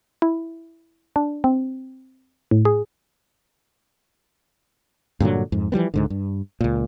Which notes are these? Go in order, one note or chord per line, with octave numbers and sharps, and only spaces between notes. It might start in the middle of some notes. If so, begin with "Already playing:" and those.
E4
D4
C4
A2
G#4
G2 A#2 D3 F#3
F2 G#2
E3 F3 G3 B3
C#2 G#2 D3
G2
C#2 A#2